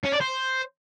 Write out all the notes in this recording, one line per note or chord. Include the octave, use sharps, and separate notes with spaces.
C#4
D5
C5